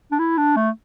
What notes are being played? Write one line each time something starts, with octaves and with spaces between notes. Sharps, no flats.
D4
E4
D4
A3